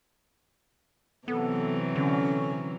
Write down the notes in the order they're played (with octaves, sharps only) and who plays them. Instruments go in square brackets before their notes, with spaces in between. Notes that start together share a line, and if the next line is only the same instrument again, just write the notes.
[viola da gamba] C3 E3 F#3 [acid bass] B3 [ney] A4
[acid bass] D3 [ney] C#4